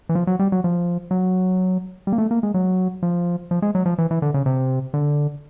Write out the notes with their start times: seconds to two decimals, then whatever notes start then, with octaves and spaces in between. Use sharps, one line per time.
0.09 E3
0.15 F3
0.27 F#3
0.39 G3
0.52 F#3
0.64 F3
1.11 F#3
2.07 G3
2.12 A#3
2.18 A3
2.31 A#3
2.43 G#3
2.54 F#3
3.03 F3
3.51 F3
3.62 G#3
3.75 F#3
3.86 F3
3.98 E3
4.11 E3
4.22 D3
4.34 C#3
4.46 C3
4.94 D3